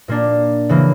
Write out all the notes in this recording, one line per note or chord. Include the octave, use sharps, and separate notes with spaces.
A#2 A#3 D4
C#3 E3 A#3